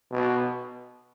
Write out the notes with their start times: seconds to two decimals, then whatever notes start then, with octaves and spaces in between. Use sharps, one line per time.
0.12 B2